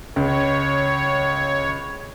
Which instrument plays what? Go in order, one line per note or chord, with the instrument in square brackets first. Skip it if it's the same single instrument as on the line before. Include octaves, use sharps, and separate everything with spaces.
[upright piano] C#2 [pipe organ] C#5